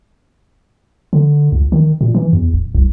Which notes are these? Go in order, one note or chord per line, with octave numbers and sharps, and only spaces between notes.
D3
C#2
D#3
A#2
E3
E2
D1
C2